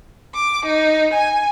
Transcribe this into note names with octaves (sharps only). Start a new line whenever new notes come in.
D6
D#4
G#5